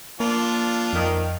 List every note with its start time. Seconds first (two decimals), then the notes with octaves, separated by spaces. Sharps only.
0.20 F3 A#3 D4 F4
0.93 F2 D#3